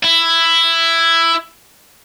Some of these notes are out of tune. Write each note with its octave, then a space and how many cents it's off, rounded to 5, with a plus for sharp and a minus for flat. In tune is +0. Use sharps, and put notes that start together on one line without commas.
E4 +10